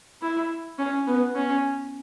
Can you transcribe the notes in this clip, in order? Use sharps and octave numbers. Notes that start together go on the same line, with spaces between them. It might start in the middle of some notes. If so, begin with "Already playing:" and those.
E4
C#4
B3
C#4